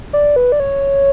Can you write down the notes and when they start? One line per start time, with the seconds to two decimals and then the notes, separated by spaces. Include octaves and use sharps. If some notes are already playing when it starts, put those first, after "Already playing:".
0.13 D5
0.36 B4
0.52 D5
0.60 C#5